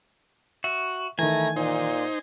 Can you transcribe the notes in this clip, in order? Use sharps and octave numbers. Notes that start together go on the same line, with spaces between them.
F#4 E5
D#3 E3 A3 G#5 A#5
A#2 D#4 C5